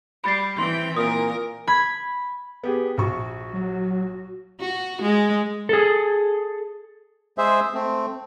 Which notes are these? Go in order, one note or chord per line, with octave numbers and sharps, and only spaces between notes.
G3 B5 A6 C7
E3 C4 G5 C6
A#2 A#4 D#6
B5 G#6
B3 G4 G#4
A#1 F#4 C#6
F#3
F#4
G#3
G#4 A4
G#3 G#4 C5 E5
A3 C4